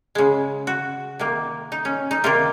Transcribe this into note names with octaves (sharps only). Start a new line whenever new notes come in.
C#3 G#3
F#4
C3 D#3 A#3
D#4
C#4
D#4
C3 D#3 A#3 F4